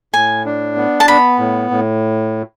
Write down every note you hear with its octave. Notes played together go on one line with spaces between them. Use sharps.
A2 G#5
D4
B3
A5
B3 B5
A2
A2